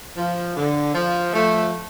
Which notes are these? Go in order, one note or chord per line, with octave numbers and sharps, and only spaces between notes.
F3
D3
F3
F3 A3